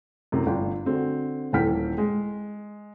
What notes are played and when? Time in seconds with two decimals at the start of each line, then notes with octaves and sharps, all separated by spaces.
0.32 F#2 A2 C3
0.46 G1 D4 G5
0.85 D3 C4 F#4
1.53 D#1 E3 A4 G5 F6 B6
1.98 G#3